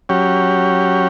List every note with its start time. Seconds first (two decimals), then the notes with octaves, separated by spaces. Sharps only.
0.09 F#3 C#4 G4